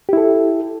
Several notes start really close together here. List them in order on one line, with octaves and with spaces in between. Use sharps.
G4 E4 A4